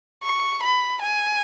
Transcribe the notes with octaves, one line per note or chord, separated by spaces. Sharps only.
C#6
B5
G#5